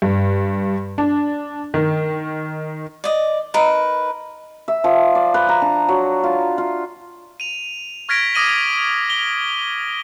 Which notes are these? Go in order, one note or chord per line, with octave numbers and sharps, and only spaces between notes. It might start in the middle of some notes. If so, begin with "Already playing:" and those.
G2
D4
D#3
D5 D#5
D#4 A#4 B4
E5
F3
D5
B4
A#5
D4
F#3
F4
F4
D#7 F7
C#6 F6 G#6 A#6 B6 D7
D6 D#6 A#6 D#7 F#7 G7
G7